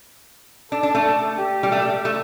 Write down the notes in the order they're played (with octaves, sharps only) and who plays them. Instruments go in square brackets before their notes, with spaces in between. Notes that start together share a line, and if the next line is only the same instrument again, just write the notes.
[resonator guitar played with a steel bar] D4 [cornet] A4
[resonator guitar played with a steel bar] D4
A3
[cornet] G4
[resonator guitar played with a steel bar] G3
A3
A3